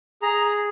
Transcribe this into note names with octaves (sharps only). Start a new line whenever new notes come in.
G#4 A#5